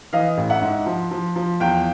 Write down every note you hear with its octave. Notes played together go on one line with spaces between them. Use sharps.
E3 D#5 F5
A1
E5 F#5
G#2
F3
F3
F3
E2 F5 G5